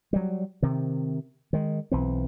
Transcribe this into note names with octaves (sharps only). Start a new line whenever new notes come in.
F#3 G3
C3 D#3
D#3 G#3
B1 E3 C4